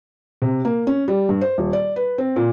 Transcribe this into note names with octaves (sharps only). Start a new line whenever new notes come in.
C3
A#3
C#4
G3
G2
C5
D#1
D5
B4
C4
A#2